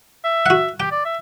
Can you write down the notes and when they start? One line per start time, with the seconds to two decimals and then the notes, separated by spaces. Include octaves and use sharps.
0.24 E5
0.46 F#4 F#5
0.80 G4 G5
0.91 D5
1.05 E5